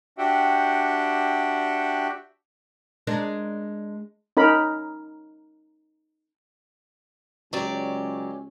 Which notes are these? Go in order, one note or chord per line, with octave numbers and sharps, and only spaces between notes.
D4 F#4 G4 E5 F#5 G5
G#3 D4 A#4
C#4 D#4 A#4 B5
C#2 F#3 G#3 C#4 G4 D5